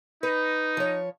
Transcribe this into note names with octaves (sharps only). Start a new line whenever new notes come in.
D#4 B4
F3 C#5